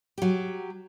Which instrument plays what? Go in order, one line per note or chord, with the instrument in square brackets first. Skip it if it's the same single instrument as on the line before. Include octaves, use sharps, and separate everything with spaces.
[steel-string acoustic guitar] F#3 G4